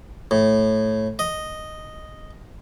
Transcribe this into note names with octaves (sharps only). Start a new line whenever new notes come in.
A2
D#5